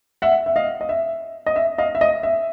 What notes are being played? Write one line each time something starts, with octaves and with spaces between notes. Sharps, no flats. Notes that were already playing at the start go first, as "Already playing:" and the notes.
E5 F#5
E5
D#5 F5
D#5
E5
D#5
E5
D#5 F5
E5
D#5
E5